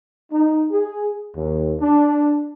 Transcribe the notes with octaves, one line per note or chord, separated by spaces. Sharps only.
D#4
G#4
D#2
D4